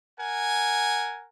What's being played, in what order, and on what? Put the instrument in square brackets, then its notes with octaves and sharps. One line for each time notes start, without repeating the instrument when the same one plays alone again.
[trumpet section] A#4 F#5 G#5